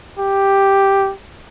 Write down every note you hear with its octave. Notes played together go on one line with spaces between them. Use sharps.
G4